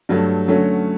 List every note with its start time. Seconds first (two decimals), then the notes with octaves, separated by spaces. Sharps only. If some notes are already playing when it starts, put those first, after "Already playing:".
0.09 G2 F#3 A3
0.48 D3 F#3 A3 C#4